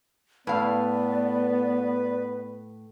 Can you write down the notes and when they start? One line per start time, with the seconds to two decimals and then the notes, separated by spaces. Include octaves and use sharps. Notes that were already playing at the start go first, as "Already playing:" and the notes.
0.47 A2 B3 B4 D5 F5